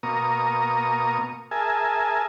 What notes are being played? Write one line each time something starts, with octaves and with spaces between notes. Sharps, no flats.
B2 A#3 A#5 C#6 D#6
G#4 A#4 E5 G#5 A5